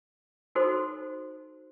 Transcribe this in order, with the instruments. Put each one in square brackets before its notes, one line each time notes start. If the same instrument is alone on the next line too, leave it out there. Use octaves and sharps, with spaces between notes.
[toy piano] D#4 F#4 A4 C5 C6